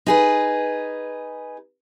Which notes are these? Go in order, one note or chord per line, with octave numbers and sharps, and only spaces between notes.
D#4 G#4 B4